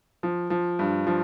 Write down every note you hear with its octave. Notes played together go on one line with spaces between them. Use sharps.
F3
F3
G2
F3